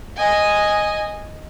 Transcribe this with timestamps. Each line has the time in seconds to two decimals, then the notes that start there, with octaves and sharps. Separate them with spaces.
0.17 D#5 G#5